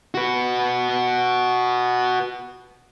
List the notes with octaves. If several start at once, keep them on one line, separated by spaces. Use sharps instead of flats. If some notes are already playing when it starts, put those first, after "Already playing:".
F#4 B4